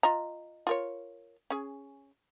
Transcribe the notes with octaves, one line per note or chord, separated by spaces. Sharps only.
F4 D#5 A#5
F4 A#4 C#5
C#4 G#4